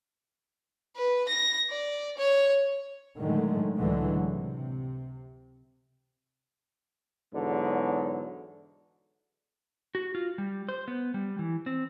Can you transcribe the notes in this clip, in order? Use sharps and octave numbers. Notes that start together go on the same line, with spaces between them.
B4
A#6
D5
C#5
A2 D3 D#3 F#3 G#3 A3
C#2 A2 D3 E3 F#3 G#3
C3
E2 G#2 D3 F#3
F#4
F4
G3
C5
B3
G3
E3
C4